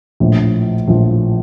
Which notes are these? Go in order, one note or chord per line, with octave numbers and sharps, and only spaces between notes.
A#1 A2 F3
A#1 A2 F3